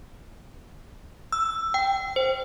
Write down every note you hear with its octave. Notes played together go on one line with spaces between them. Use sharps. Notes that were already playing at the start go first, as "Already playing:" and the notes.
E6
G5
C5